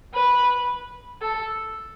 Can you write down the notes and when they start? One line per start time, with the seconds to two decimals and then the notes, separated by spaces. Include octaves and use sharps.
0.14 B4
1.21 A4